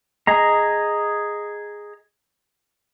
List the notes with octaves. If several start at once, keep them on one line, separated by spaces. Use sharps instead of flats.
G#4 D#5 A#5